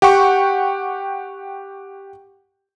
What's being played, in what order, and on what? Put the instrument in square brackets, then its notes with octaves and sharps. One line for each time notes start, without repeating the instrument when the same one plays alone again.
[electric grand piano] G4 F#5 G5 C#6